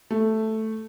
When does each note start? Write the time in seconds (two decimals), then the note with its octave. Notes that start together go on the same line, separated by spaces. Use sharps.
0.11 A3